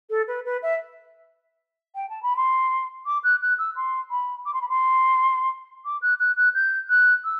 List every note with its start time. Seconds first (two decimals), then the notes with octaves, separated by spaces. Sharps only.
0.09 A4
0.27 B4
0.45 B4
0.62 E5
1.95 G5
2.09 A5
2.22 B5
2.36 C6
3.05 D6
3.23 F#6
3.41 F#6
3.58 E6
3.75 C6
4.10 B5
4.45 D6
4.53 C6
4.61 B5
4.69 C6
5.85 D6
6.01 F#6
6.19 F#6
6.36 F#6
6.54 G6
6.89 F#6
7.24 E6